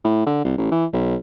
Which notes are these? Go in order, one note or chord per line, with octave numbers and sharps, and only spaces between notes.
A2
D3
C2
A1
E3
B1